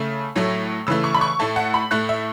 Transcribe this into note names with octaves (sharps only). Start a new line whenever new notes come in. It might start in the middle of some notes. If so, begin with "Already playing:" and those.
Already playing: C#3 A3
A2 F#3 A3
C#3 E3 A3 E6
C#6
B5
C#6
A2 A3 A5
F#5
B5
A2 A3 F#6
E5